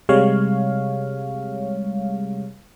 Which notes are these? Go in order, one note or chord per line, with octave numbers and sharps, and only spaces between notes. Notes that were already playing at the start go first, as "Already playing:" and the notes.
C3 G3 G#3 C#5 F5